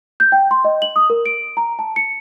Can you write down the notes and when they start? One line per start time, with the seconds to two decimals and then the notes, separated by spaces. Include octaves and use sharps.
0.20 G6
0.32 G5
0.51 C6
0.65 D#5
0.82 F#7
0.96 D#6
1.10 A#4
1.26 D7
1.57 A#5
1.79 A5
1.96 C#7